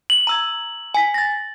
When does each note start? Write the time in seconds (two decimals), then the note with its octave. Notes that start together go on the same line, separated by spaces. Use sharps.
0.10 F#7
0.27 A#5 E6 G#6
0.94 G#5 B6
1.14 A6 A#6